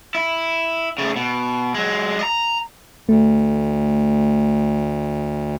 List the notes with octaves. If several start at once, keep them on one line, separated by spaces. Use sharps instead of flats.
E4
C#3 A3
B2
F#3 G#3
D#5 A#5
D2 A3